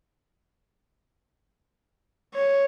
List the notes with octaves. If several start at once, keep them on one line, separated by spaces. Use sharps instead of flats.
C#5